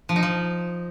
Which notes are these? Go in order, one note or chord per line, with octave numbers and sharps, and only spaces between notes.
F3
D#4
F3